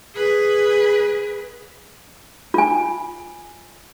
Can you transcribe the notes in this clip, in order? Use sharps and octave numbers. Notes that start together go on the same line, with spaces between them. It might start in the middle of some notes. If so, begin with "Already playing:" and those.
G#4 B4
F4 G#5